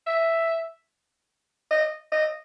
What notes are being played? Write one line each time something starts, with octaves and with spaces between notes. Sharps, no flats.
E5
D#5
D#5